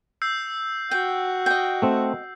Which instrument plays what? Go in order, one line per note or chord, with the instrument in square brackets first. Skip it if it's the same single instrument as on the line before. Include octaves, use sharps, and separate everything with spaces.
[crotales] E6 G6 C7
[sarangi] F#4 [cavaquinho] G5
[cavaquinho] D#5 G5
[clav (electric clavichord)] A3 C4